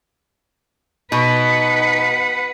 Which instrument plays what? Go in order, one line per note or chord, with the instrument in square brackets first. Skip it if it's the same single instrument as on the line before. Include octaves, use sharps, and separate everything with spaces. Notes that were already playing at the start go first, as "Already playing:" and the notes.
[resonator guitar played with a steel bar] B2 [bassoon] D#4 [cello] B4 F#5